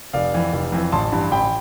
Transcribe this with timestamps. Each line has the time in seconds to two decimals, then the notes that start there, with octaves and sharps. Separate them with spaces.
0.13 F1 D5 F5
0.34 F2 E3
0.53 F1
0.72 F2 E3
0.92 A1 A5 C6
1.12 G2 E3
1.31 A1 G5 B5